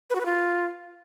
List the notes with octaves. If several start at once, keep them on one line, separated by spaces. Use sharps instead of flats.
B4
F#4
B4
F4